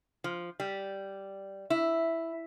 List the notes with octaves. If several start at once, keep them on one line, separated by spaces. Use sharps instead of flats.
F3
G3
E4